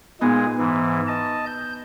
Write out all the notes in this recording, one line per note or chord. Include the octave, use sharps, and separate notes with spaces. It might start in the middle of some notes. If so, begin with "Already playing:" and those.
A#2 G#3 B3 D#4 G#4
G#2 E3
D#5 A5
G6